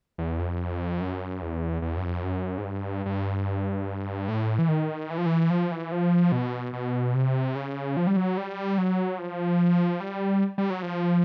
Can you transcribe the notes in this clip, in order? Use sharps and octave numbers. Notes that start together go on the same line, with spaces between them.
E2
F2
F#2
E2
E2
F#2
F2
F#2
G#2
G2
G2
A2
E3
D#3
E3
F3
E3
F3
E3
F3
B2
B2
C3
C#3
F3
G3
F#3
G3
F#3
F3
G3
G3
F#3
F3